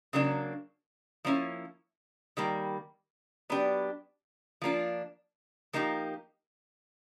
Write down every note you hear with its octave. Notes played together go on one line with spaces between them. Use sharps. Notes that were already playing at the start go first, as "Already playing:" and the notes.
C#3 F#3 A#3 D4
F3 A#3 C#4 E4
D#3 G3 A#3
F#3 B3 D4 G4
F3 A#3 D4 F4
F3 A#3 D#4 G4